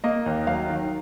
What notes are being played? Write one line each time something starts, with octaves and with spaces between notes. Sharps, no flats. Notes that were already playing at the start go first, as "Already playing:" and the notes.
A#3 D#5
D#2
F#3 F5
D#3